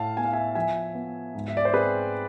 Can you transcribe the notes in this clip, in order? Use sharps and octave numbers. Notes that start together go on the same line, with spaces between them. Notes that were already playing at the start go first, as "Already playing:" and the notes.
Already playing: A2 F5 A5
B3 G#5
F5
E5 G#5
F3 E5 G#5
B3
G#2
E5
D5
C5
C4 G#4 B4